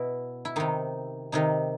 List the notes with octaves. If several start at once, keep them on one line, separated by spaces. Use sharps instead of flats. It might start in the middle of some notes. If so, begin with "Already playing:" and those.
Already playing: B2 E4
E4
C3 D#3 D#4
C3 D#3 D#4